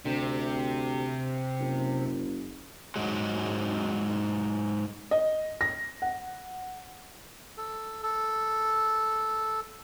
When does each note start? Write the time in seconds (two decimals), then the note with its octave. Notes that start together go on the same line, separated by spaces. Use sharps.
0.05 D2 C3
1.60 F#1
2.96 G#2 F#3 G#3
5.11 D#5
5.61 A#6
6.02 F#5
7.58 A4
8.03 A4